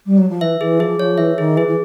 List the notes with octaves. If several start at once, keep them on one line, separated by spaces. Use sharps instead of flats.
G3
F#3
F3
E3 E5
E3 G#4
F3 G#4
F3 C#5
E3 E5
D#3 G#4
E3 G#4
E3